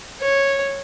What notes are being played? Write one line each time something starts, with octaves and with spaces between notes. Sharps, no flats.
C#5